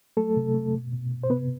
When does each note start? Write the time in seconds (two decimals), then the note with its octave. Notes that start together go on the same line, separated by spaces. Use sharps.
0.17 F#3 A3 A4
0.36 C3
0.55 A3
0.74 B2
0.93 B2
1.11 B2
1.23 C5
1.30 C3 B3 B4